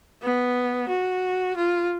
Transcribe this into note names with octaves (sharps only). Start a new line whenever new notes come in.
B3
F#4
F4